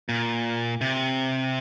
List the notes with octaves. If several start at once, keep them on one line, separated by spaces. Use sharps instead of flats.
A#2
C3